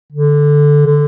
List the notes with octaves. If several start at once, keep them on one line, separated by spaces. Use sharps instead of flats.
D3
D3